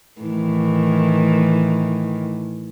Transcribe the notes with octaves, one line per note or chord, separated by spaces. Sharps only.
A2 D#3 E3